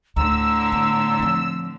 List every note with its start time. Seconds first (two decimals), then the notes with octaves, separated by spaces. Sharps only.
0.16 D2 A2 D3 A#5 E6
0.72 B3
1.19 F3 C4